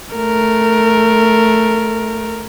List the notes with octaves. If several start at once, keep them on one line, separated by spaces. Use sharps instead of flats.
A3 A#4